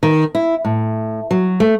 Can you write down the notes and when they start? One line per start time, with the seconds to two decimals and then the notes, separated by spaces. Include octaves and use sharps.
0.03 D#3
0.35 E4
0.65 A2
1.31 F#3
1.60 A3